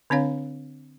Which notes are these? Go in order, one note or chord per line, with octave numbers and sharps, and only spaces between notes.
D3 C4 D4 C#5 F5